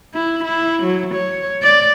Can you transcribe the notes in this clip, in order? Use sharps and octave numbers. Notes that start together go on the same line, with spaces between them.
E4
E4
F#3
C#5
D5